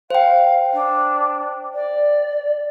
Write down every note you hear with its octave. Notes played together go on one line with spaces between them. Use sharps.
C5 F5 G5
D4
D5